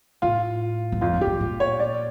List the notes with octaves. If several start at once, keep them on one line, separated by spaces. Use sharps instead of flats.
A2 F4
G2
F2 F4
G2
G4
G2
A#2
C#5
D5